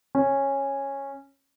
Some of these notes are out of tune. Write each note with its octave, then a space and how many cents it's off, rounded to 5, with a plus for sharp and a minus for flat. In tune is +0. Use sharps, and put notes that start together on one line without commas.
C#4 -10